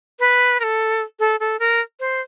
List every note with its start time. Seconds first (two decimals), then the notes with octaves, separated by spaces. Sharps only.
0.19 B4
0.60 A#4
0.63 A4
1.19 A4
1.40 A4
1.59 A#4
2.00 C5